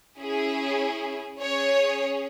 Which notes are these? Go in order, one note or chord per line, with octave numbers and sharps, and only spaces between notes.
C#4 E4 G#4
C#4 G#4 C#5